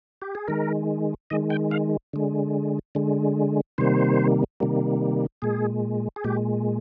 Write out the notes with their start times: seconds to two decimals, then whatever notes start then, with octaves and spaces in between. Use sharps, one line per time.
0.22 G4
0.35 G#4
0.48 D#3 G#3 A#4
1.30 D#3 G#3 D#5
1.50 G5
1.71 F5
2.13 D3 G#3
2.95 D3 G#3
3.78 C3 D#3 G3 A#3 C5
4.60 C3 D#3 G3 A#3
5.42 A#2 G#3 G#4
6.16 G#4
6.24 A#2 G#3 G4